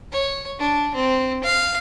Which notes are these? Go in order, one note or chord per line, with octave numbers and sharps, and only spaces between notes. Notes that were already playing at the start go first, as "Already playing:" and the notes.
C#5
D4
C4
F5